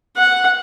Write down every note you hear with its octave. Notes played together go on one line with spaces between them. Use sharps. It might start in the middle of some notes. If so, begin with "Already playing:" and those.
F#5